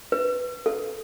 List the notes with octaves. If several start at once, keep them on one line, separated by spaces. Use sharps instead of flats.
B4
A4